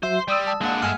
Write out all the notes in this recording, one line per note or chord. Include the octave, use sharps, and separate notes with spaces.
F#3 F#4 C5 E5 C6
G3 D5 D#6 E6
A5
G#3 A#3 D4 F#5
G2 G#3 A4 E5 G#5 F6